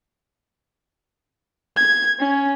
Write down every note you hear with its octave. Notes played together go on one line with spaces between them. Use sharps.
G#6
C#4